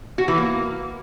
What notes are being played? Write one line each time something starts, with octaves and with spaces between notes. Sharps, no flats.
F#4
E3
A#3